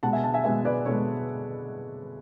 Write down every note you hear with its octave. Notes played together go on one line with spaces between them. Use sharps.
B2 G#3 F#5 A5
E5 G#5
F#5 A5
E5 G#5
B2 G#3 E5 G#5
B4 D5
B2 G#3 A4 C#5